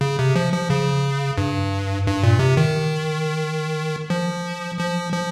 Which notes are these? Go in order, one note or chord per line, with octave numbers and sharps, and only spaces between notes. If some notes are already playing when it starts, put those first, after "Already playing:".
C#3
C3
F3
F3
C#3
G2
G2
A#2
C3
D#3
F3
F3
F3